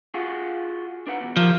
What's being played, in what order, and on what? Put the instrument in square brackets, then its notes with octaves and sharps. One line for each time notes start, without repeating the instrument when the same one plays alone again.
[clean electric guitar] F4 F#4 G#4
D4 B4 F#5
E2 B2
[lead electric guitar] F3 [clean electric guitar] G3 A#4 F5